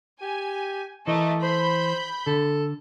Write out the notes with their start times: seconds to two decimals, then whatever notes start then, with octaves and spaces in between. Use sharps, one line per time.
0.22 G4 G#5
1.07 E3 A3 A4 A#4 D#5
1.42 C5 B5 G6
2.27 D3 A4